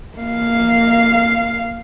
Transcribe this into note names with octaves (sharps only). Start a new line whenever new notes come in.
A#3 F5